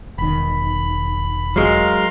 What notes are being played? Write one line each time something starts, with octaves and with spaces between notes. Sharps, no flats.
E1 D#3 B5
F#3 G#3 A#4 F5 C6